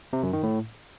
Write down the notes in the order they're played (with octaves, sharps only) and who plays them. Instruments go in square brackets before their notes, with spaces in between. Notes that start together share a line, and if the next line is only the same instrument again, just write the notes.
[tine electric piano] C3
F#2
D#3
A2